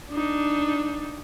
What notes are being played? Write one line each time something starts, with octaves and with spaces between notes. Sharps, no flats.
D4 D#4